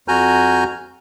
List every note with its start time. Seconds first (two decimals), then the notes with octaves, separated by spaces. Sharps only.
0.08 F2 F#4 G#5 A#5 F6 G6